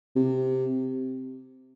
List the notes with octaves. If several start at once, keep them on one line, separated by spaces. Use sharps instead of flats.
C3